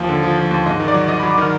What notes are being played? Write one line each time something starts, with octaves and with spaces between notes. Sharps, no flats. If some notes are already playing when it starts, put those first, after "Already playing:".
Already playing: D#2 F3 F5
D3
F3
F3
D#2
G#2 D#5
D#3
D5
F#3
F#3 D#5
B5
F#3
D6
D#3 F6